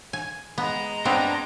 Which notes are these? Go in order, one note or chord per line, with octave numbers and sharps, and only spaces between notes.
G#5
G#3 B3 A#5
B3 C4 D4 G5